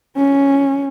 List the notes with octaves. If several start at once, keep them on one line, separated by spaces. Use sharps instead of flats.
C#4